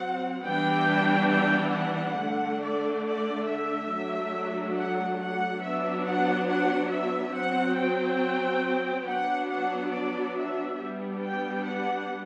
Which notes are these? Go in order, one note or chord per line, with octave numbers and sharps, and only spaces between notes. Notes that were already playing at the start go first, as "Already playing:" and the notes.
Already playing: F#3 C4 F#5
E3 G3 B3 D4 G5
G5
F#5
D3 A3 D4
D5
D5
E5
F#3 A3 D4
F#5
F#5
F#3 B3 D4 E5
F#5
F#5
E5
F#3 C4 F#5
G5
F#3 B3 D4 F#5
F#5
D5
E5
G3 B3 D4
G5
F#5